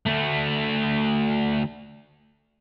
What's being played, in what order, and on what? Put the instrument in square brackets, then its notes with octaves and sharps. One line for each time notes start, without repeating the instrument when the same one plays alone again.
[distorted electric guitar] D2 A3